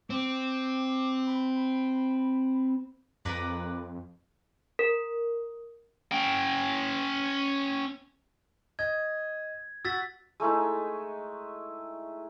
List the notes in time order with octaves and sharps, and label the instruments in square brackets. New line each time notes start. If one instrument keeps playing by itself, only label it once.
[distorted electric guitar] C4 [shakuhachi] D6
[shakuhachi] B5
[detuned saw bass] F2 [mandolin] A#4 B4 D5
[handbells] A#4
[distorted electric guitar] C#4 G5
[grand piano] D#5 [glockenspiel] G#6
[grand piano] F#4 [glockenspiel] E6 A6 B6
[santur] G#3 A3 D#4 E4